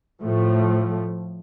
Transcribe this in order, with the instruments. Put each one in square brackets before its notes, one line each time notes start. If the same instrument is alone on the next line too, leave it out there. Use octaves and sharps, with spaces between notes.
[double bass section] A2 F3 A3